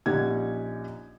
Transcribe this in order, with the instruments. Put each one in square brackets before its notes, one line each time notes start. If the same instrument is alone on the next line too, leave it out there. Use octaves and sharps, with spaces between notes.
[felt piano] A#1 C#4 D#4 G4 F#5 G#6